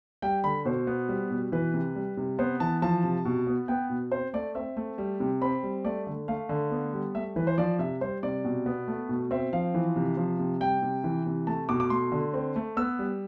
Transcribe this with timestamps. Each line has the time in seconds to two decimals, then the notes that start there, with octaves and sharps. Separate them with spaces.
0.22 G3 G5
0.44 D3 B5
0.65 B2 C5
0.87 B3
1.09 G3
1.31 B2
1.52 E3 B4
1.74 C3
1.95 G3
2.17 C3
2.39 B3 C5
2.60 E3 A5
2.82 F3 A5
3.03 C3
3.25 B2
3.47 B3
3.68 B3 G5
3.90 B2
4.11 C4 C5
4.34 A3 D5
4.55 C4 E5
4.77 A3
4.98 G3
5.20 C3
5.41 C4 B5
5.63 G3
5.85 A3 D5
6.07 D3
6.28 A3 F5
6.49 D3
6.71 B3
6.93 G3
7.15 A3 E5
7.36 E3 B4
7.47 C5
7.58 F3 D5
7.79 C3 E5
8.01 G3 C5
8.23 C3 D5
8.45 B2
8.66 B3
8.88 A3
9.09 B2
9.31 C4 E5
9.53 F3 F5
9.74 E3
9.96 C3
10.17 F3
10.39 C3
10.60 G3 G5
10.82 C3
11.04 E3
11.26 C3
11.47 A3 A5
11.69 B2 D6
11.80 D6
11.90 A3 C6
12.12 D3
12.34 C4
12.56 A3
12.77 B3 E6
12.99 G3